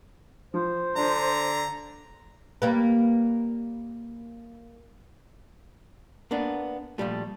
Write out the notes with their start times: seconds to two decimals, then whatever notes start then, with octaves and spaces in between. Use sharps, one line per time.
0.54 F3 C5
0.96 D3 D4 A#5
2.62 G3 A#3 B4
6.31 A#3 B3 D4
6.98 A#2 E3 F3 G3 A3